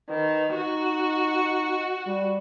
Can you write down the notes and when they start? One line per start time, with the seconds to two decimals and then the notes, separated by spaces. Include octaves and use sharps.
0.10 D#3 B4
0.55 D#4 F#4
2.07 G3